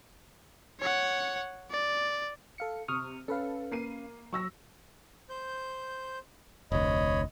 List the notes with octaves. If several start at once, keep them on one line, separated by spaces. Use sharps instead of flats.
C#5 F#5
D5
A4 F5 C#7
C3 C#6 D#6 F6
C#4 A4 B4 F5
A#3 C7 D#7
F#3 C#6 E6 A#6
C5 G6
F1 D2 C#5 D#5 B5